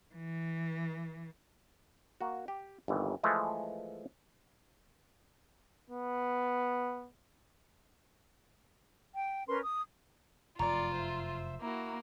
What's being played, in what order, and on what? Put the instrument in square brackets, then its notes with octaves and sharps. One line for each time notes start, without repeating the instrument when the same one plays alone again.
[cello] E3
[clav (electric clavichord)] A#3 F#4
G4
G1 D#2 E3
E3 F3 G#3 A3
[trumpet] B3
[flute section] G5
C#4 A#4 B4 C6
D#6
[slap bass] F1 F#2 [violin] F4 [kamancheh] D5 [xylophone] A#5
[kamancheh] C5 E5
[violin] A#3 [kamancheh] E4 F#4